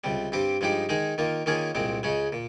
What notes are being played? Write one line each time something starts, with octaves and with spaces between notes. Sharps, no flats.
C#2 C3 G3
G2 G3 C4 G4
G2 F3 G#3 D#4 G4
D#3 G#3 D#4 G#4
D#3 A#3 F4
D#3 A#3 C#4 F4 G#4
C2 A#2 G#3 C4
C#2 C#3 G#3 C#4
A#2